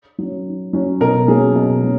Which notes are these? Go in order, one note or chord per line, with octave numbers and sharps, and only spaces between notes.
F#3 C#4
D#3
F#3 C#4
B2 A#4
F#3 A#3 C#4 G#4
B2
F#3 A#3 C#4